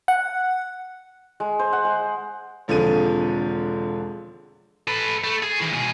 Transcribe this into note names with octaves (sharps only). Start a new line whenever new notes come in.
F#5
G#3
C5
F#5
G#3
E1 D3 F3 C4 G#4 D#7
A4 B4
A3
G#4
D#3 E3
B2 G#4